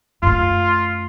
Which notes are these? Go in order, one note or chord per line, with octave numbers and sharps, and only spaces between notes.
F#2 A3 F4